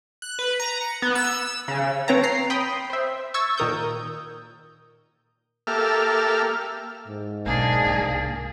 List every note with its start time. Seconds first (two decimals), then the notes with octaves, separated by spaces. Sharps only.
0.22 F#6
0.39 B4
0.60 A#5
0.81 C#7
1.02 B3
1.15 E6
1.68 C#3
2.08 C4 B4 C#5 G5 A5 A#5
2.23 A#5 C7
2.50 G5 B5 C6 D#6
2.90 C5 E5
3.34 C#6 E6 G#6 A6
3.58 A#2 D#3 A#4 D#6 G6
5.67 A#3 G4 A4 E5 F6
7.08 G#2
7.46 B1 A#3 D4 G#4
7.87 C2